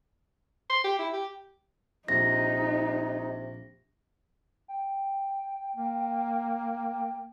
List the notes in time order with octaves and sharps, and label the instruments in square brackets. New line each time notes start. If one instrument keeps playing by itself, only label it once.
[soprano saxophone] C6
G4
E4
G4
[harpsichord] A#1 [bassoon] C3 [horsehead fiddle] D#4 [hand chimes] A#6
[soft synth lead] G5
[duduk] A#3